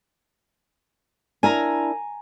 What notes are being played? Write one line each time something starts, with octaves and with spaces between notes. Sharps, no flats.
D4 E4 A#4 G#5 A#5